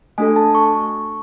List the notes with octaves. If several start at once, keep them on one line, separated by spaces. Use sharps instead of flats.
A3 D4 F#4 A4 G#5
A5
C#6